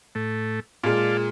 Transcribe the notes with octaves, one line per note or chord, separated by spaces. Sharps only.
A2 A3
A#2 G#3 D5 F5 A5